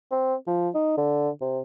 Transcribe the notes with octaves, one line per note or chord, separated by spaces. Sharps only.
C4
F3
D#4
D3
C3